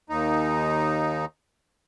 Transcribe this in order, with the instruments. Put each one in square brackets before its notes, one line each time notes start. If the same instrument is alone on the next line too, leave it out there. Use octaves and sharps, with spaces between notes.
[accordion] D#2 D#4